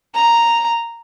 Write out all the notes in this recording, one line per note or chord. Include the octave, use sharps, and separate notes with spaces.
A#5